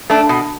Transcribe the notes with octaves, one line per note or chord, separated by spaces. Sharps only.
A3 D4
B2